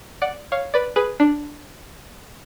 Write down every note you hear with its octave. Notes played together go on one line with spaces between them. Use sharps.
D5 F#5
C#5 F5
B4 D5
G#4 B4
D4